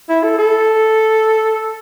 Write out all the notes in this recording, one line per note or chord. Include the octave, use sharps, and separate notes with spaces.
E4
A4
A4